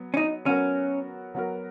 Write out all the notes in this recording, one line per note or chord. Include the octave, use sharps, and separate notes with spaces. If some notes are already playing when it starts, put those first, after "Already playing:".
Already playing: F#3 B3
C#4
D#4
F#3 B3 C#4 F#4 A#4
F#3 B3 F#4 A#4